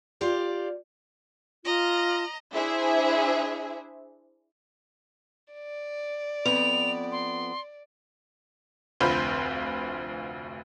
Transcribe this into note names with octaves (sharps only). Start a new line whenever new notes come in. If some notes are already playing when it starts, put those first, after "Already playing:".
F4 G4 D5
F4 D#5 A#5
D4 E4 G#4 C5 E5
D5
F2 B3 F7
C6
F1 D2 C4 F4 B5 G6